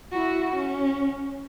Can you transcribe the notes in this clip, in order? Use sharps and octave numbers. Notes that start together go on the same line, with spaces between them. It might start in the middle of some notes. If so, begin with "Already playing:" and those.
E4 F#4
C#4